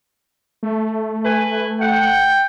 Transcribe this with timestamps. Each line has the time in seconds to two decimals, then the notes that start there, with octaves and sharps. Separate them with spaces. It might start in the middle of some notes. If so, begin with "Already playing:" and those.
0.63 A3
1.25 B4 G#5
1.81 F#5 G5